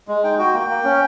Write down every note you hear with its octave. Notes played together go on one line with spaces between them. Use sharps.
G#3
D#4 G5
F#4 G5
A#3 G5
A#3
C#4